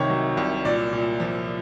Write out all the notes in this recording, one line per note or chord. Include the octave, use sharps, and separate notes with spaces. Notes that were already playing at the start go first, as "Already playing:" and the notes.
Already playing: C2 C3 D#3 C#5
F#3
C2
A#2 D5
A#2
F3